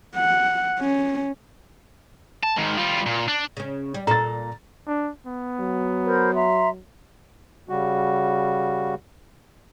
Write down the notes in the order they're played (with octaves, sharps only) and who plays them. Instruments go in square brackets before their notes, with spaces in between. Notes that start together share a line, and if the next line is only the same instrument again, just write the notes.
[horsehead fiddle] F#5
C#4
[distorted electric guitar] A5
G#2 D#3
G3 F4
A#2
D4
[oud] C#3 C#4
G3
[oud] A#2 A4 [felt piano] A#5 A6
[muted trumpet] D4
B3
[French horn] F#3
[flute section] A#4 C5 B5
E5 A#5 C6
[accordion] C#3 G3 F#4